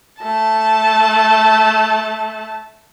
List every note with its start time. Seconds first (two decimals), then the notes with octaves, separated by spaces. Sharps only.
0.20 A3 A5